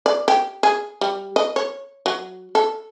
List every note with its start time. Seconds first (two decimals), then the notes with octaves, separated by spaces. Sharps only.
0.06 D5
0.28 G4
0.63 G#4
1.01 G3
1.36 D#5
1.56 C#5
2.06 F#3
2.55 A4